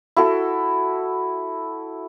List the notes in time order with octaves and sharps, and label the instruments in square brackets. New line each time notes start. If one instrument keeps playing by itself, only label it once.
[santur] E4 F#4 A4